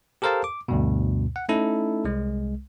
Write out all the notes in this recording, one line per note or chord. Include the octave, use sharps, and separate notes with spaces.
G4 A4 A#4 C5 F5 A5
D6
D2 G2 B2
F#5
A3 C#4 D#4 E4 A4
C2 G#3